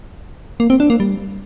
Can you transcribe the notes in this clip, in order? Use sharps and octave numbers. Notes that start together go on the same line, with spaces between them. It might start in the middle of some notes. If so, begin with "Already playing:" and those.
A#3
C4
D4
A#3
G3